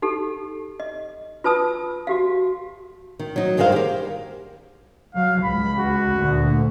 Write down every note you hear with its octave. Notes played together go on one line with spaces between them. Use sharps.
D#4 G4 A4
D#5
F4 B4 A5 D#6 E6
F#4 G4 F5
D#3
F#3 D#4
G2 D#3 G#4 A#4 C5 F5
G4 A#4
F#3 F5
C#2 B5
F#4
D2 A#2 D3